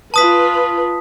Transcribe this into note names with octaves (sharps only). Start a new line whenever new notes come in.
F4 B4 A5 D#6 B6